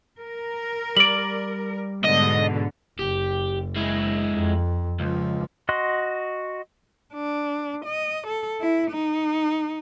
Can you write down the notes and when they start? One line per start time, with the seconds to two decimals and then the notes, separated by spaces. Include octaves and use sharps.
0.19 A#4
0.97 G3 D5 D7 F#7
2.04 G#2 B2 D3 D#5
2.99 F#1 G4
3.76 G#3 E4
4.33 F2
5.00 C#2 F3
5.69 F#4 D#5 C6 F#6
7.14 D4
7.86 D#5
8.27 A4
8.61 E4
8.91 D#4